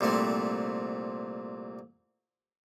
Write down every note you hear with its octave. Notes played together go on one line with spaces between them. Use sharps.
C2 A#2 A3 C4